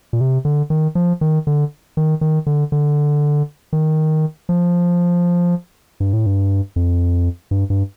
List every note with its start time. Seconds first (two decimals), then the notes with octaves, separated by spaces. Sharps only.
0.13 A#2
0.21 C3
0.45 D3
0.70 D#3
0.95 F3
1.21 D#3
1.47 D3
1.97 D#3
2.21 D#3
2.46 D3
2.72 D3
3.73 D#3
4.49 F3
6.00 G2
6.13 A2
6.26 G2
6.76 F2
7.51 G2
7.70 G2